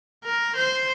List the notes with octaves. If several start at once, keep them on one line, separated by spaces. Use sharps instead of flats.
A#4
C5